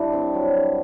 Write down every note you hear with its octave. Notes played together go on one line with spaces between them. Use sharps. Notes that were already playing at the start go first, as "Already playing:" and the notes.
Already playing: G2 D4 E4 D5
C4
F#3
G2